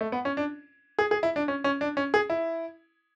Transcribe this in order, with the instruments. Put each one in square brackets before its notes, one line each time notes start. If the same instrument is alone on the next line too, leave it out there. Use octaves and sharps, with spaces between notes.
[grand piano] A3
B3
C#4
D4
G#4
G#4
E4
D4
C#4
C#4
D4
C#4
G#4
E4